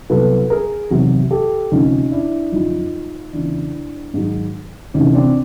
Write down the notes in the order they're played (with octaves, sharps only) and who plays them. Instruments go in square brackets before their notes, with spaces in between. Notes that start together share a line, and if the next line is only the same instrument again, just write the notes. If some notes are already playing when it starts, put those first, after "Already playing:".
[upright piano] C2 B2 F#3 A4 B4
G#4 A#4
E2 C3 D#3 F#3
G4 A4
D2 C3 F3 C#4 D#4
D4 E4
F#2 D3 F3 D#4 F4
E2 C#3 E3 D4 E4
G#2 D#3 F#3
D2 C3 E3 C#4 D#4
C4 D4